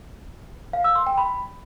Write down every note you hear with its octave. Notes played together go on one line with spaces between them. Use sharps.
F5
E6
C6
G5
B5